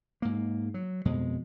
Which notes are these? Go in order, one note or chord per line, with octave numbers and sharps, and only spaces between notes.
G#2 A#3
F#3
F2 B2 G#3